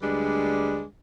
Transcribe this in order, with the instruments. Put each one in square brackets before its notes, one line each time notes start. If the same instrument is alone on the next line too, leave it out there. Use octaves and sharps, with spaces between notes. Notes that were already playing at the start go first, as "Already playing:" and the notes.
[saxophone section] D2 G3 G#3 D4 B4